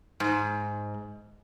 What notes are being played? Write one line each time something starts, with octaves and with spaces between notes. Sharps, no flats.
G#2